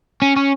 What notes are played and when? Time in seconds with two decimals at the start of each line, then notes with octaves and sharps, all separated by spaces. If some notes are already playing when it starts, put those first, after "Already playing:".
0.22 C#4
0.36 C#4